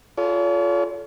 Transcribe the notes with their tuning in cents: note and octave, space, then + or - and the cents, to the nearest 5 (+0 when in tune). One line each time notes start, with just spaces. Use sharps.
F4 +0 A4 -25 C#5 +45